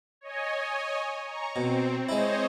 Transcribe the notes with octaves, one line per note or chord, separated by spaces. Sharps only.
C#5 D#5 G#5
A#5 C#6
B2 C4
G#3 E4 C5 C#5 D#5